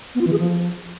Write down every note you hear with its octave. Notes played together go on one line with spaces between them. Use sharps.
B3
F4
E3
G#4
F3